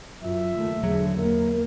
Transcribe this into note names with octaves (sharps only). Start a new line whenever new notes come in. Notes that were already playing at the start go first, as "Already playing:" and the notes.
F#2 F4 E5
F#1 D#2 A3
E2 D3 F#3 A3 G#4
E2 A#3 B3 A#4